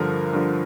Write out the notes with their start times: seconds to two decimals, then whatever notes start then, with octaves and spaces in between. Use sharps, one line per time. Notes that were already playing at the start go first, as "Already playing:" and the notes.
Already playing: G2 D3 F3 A#4
0.33 G2 D3 F3